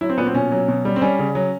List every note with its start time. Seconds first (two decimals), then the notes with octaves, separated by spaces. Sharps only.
0.01 F#3 E4
0.10 C4
0.18 A#2 B3
0.27 C4
0.34 B2 C#4
0.52 F#3
0.68 B2
0.85 G3
0.96 C4
1.01 G3 C#4
1.19 C#3
1.35 F#3